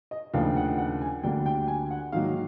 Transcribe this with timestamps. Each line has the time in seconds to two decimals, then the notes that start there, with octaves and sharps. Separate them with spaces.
0.11 D#5
0.33 D#2 C#3 F3 A3 D4 F5
0.56 F#5
0.78 F#5
1.01 G#5
1.23 D2 D3 G3 A#3 D4 G5
1.46 G5
1.68 G#5
1.91 F#5
2.12 G#2 D#3 F#3 A#3 F5